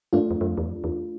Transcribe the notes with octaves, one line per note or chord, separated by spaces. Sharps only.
G2 A3 D4 F4
F2
F#2
F2
E2
F2
E2